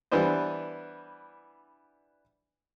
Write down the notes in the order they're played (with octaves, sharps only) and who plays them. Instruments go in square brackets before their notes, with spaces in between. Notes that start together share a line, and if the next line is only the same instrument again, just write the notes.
[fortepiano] E3 G3 B3 D4 C5